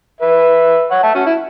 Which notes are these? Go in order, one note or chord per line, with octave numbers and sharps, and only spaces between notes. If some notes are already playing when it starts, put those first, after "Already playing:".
B4 E5
C#5 F#5
E5 A5
C#4 F#4
E4